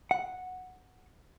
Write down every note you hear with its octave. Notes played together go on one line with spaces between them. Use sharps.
F#5